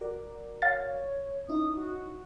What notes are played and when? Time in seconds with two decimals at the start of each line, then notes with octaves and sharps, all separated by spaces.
0.01 F#4 A#4 D5
0.62 C#5 F5 A6
1.49 C#4 D#4 E4 D#6
1.76 F#4